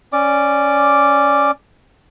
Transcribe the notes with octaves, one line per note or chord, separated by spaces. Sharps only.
C#4 D5 D6